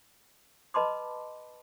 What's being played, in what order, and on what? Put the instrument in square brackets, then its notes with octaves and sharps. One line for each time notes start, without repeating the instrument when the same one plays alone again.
[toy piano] B4 D#5 A5 B5 C6 D6